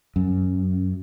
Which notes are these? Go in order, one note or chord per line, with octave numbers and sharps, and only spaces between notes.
F#2